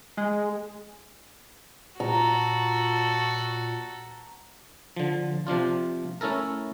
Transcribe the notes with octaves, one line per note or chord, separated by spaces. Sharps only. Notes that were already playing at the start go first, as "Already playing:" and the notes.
G#3
A#2 F#4 A4 A#5
D3 F3
C3 F3 D4 F4
A3 C#4 E4 A4 A#4